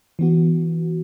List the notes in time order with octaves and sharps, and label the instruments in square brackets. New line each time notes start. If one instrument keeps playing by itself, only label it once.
[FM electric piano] E3 B3 F#4